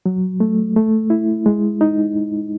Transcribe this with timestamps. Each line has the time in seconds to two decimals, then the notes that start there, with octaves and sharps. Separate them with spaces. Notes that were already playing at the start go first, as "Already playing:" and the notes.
0.06 F#3
0.40 A3
0.76 A3
1.10 E4
1.46 G#3
1.81 D#4